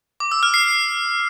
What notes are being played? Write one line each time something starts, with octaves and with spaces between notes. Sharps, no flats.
D6
E6
F6
C7